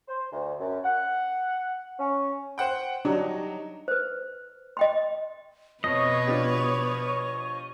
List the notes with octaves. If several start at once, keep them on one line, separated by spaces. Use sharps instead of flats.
C5
D2
F#2
F#5
C#4
C5 F#5 G5
F#3 D4 D#4 F#4 G4
B4 C5
D#5 G5 C6
F2 B2 B4 C#5 D#5 C#6
F3 D4 G4